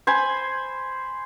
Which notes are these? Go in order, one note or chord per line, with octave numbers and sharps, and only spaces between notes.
C5 G#5 B5